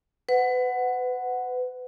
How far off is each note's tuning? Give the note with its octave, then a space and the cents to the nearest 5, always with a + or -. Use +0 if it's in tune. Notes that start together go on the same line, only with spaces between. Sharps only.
B4 +30 F#5 +0